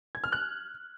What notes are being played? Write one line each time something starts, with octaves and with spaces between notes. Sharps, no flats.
G#6
F6
F#6